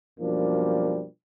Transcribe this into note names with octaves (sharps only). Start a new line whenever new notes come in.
F#2 B2 F3 G3 A#3 D4